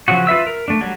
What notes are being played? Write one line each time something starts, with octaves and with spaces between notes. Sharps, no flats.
C#3 F3 F#3 F#4
F4 B4 E5 E6
A#4
A3 D4
F#3 G3